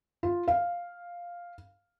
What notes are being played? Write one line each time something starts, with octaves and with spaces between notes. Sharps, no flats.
F4
F5